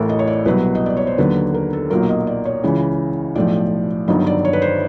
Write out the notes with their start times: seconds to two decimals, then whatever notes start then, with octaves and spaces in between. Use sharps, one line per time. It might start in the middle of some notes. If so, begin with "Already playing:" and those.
Already playing: A1 A2 E3 A4 A#4
0.09 D#5
0.19 C#5
0.27 D5
0.45 C2 B2 F#3 B4
0.75 D#5
0.86 D5
0.97 C#5
1.07 C5
1.18 D#2 D3 F#3 B4
1.54 A#4
1.73 A4
1.90 B1 A#2 F#3 A#4
2.09 D#5
2.27 D5
2.45 C#5
2.63 C#2 C#3 E3
3.35 B1 A2 F3 D5
4.08 G1 G2 D#3 F#3 D#5
4.27 D5
4.45 C#5
4.53 B4
4.62 C5